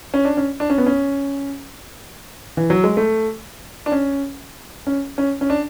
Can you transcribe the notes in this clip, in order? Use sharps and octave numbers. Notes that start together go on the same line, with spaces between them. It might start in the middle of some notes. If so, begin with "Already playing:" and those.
C#4
D4
C#4
D4
C#4
B3
C#4
E3
F#3
G#3
A3
D4
C#4
C#4
C#4
C#4
D4